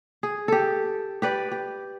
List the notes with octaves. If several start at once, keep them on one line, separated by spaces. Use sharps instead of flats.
G#4
G4 A4
G4 B4 D5
G4